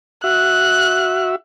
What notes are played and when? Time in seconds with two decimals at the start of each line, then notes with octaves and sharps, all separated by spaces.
0.24 F#4 E5 F#6